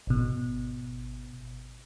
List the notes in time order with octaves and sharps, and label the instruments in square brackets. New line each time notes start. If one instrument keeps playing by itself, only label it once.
[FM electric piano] G#1 B2